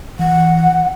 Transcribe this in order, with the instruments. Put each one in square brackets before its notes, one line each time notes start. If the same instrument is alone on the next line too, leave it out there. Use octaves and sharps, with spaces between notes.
[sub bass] E3 [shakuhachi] F#5